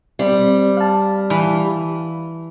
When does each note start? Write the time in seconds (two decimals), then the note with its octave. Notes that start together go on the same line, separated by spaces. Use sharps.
0.19 G3 C4
0.77 F5 A5
1.30 E3